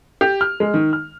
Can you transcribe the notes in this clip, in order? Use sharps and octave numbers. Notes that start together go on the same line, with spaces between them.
G4
F6
G#3
D#3
F6